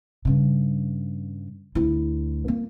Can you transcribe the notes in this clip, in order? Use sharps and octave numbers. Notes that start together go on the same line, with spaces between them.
G2 C#3
D2 E4
A#3